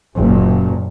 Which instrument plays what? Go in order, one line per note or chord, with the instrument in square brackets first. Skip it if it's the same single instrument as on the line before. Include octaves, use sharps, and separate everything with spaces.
[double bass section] F#1 A#2